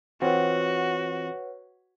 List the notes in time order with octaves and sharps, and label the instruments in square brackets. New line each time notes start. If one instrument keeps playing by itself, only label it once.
[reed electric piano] E3 C4 F4 [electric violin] F#4 [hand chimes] B4 C#5 F#5